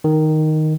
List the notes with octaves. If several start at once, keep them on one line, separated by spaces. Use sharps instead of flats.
D#3